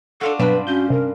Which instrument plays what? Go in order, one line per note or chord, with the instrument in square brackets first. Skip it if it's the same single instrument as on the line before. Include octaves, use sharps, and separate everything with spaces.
[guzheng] D4 F4 F#4 [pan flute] A4
[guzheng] G2 C4 B5 [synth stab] B2 F#3 [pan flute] D4 [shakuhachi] B4
[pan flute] C#4 [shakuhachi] F#4 [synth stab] G6
[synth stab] C3 [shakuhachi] A#4